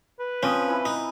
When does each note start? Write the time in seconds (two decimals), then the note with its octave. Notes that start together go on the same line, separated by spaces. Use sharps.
0.20 B4
0.43 F3 C4 C#4 D#6
0.68 E3 E4
0.85 D#4